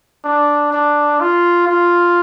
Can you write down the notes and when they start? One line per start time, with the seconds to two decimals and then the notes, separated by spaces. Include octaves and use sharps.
0.25 D4
0.73 D4
1.20 F4
1.67 F4